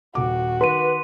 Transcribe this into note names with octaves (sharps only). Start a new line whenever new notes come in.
D#1 F#4 D6
D#3 B4 C6 D#7